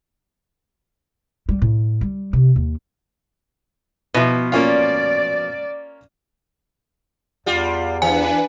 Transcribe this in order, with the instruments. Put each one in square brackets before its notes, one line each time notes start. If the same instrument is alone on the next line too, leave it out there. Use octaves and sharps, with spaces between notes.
[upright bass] G3
A2
G3
C3
D#2
[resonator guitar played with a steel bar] B2 F3 [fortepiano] B3 E4
[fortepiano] A#3 C#4 F4 [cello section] D5
[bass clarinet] E2 [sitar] G3 F4
[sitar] E3 [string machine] D4 B4 [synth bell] G#5